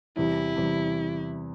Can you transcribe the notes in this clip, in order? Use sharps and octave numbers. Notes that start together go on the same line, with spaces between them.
E2 C3 E3 G3 E4
E2 C3 E3 G3